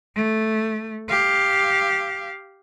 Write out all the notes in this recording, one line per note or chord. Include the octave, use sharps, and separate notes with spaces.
A3
G4 F5